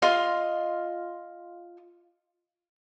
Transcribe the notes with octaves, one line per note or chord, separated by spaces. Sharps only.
F4 D#5 F5 C6